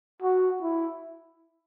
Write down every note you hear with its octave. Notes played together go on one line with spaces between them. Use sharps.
F#4
E4